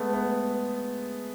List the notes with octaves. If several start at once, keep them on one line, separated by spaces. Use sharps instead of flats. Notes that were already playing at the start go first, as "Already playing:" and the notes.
Already playing: G#3 A3 B3
B3